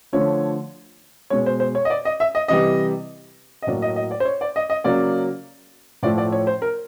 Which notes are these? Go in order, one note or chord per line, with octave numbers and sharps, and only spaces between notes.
D3 F3 A3 C#5
B2 G#3 C#5
C5
C5
C#5
D#5
D5
D#5
E5
D#5
C3 E3 G3 D#5
D#5
A2 F#3 A#3 D5
D#5
D#5
D5
C5
C#5
D5
D#5
D#5
C#3 F#3 A#3 D5
A2 F3 A3 D5
D5
C#5
C5
A#4